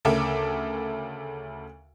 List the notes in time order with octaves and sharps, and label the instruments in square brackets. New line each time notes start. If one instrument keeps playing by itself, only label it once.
[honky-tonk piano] D2 C#3 A4 A#4 E5 D6